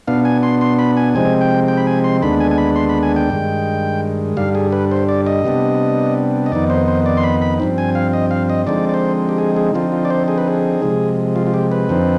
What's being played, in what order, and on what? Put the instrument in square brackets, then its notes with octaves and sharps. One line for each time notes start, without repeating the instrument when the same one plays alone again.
[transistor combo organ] B2 B3 D4 F5
G#5
C6
C6
B5
G#5
C3 F3 G#3 C4 D#4 G#5
G5
G5
B5
G#5
C6
D#2 D3 G#3 B3 D4 B5
G#5
G#5
B5
C6
B5
G#5
G5
G2 D#3 G#3
G2 D3 G3 F5
G#4
B4
C5
D5
D#5
C3 G3 B3 D4
D#5
F2 D#3 B3 D#4 D5
C5
C5
D5
C6
B5
B5
G2 F3 C4
G#5
F5
D#5
F5
D#5
D3 F3 G#3 C4 D#4 D5
D5
C5
G4
G#4
G#4
D3 F3 C4 D#4 F4
F4
D5
C5
G#4
B4
G#4
C3 F3 G#3
F4
F4
G4
B4
F2 D3 F3 C4 D#4